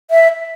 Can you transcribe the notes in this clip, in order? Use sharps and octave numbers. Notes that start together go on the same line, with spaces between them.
E5